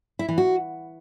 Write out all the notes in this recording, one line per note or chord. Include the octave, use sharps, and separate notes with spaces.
E4
E3
F#4